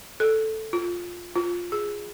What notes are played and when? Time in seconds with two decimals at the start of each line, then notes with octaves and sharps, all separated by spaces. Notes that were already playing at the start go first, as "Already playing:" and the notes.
0.20 A4
0.73 F4
1.36 F4
1.72 G#4